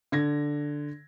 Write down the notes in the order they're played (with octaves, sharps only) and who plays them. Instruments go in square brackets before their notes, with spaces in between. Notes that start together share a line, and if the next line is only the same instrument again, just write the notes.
[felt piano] D3 G#6 A#6